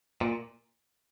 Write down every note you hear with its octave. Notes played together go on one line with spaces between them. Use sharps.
A#2